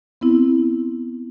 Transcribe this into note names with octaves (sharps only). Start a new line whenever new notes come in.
B3 C4 E4